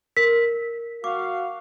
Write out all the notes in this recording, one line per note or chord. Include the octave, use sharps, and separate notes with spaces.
A#4 B6
F#4 F5 D6